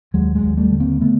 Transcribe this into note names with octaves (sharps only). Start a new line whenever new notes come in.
D#2 F#3 G#3
F#3 G#3
D#2
G3 A3
D3
A#3 C4
D3 A3 B3